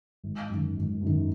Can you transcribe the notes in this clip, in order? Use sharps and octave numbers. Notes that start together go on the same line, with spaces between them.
G#1
F#2 D#3
G#1
F#2
D#3